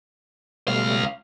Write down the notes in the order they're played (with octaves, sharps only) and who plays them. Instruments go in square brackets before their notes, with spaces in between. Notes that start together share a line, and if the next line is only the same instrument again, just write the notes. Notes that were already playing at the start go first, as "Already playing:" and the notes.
[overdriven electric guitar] C#2 F5 [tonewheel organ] B2 G3 A3